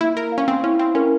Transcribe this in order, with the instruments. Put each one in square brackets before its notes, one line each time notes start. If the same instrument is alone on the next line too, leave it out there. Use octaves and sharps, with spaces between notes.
[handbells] A#3 [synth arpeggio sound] E4
[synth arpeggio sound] A#4
[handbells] F5
[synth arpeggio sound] C#4
C4
[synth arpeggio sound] C#4 [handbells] E4
[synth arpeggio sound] C4
[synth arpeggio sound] C#4 [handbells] A#4